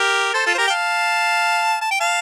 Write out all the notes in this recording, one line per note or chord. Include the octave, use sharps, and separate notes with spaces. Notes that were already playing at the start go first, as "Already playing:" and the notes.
Already playing: G4 A#4
A4 C5
F4 A4
C5
G4 A#4
G5
F5 A5
A5
G5
F5 A5